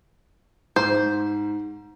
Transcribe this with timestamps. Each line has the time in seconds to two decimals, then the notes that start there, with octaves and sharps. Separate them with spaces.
0.76 G#2 C5